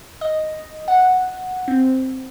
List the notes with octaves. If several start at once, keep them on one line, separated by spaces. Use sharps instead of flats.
D#5
F#5
C4